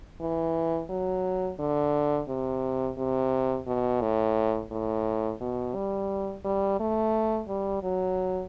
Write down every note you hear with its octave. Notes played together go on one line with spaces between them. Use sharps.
E3
F#3
D3
C3
C3
B2
A2
A2
B2
G3
G3
A3
G3
F#3